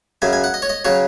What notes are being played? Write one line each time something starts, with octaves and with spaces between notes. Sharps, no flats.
F#2 C#3 F#3 G#5
G#5
F#5
D#5
C#5
D#5
C#3 F#3 C#5